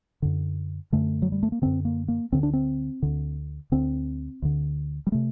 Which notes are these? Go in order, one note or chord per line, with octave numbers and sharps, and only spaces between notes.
F#2 D3
F#2 D3 A3
F#3
G3
A3
A#3
F#2 D3 C4
A#3
A#3
D2 D3 C4
D4
C4
D2 D3
D2 D3 C4
D2 D3
G3
C3 A3